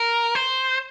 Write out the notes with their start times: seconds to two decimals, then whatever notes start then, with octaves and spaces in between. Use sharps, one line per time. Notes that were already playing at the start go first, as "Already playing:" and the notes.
Already playing: A#4
0.35 C5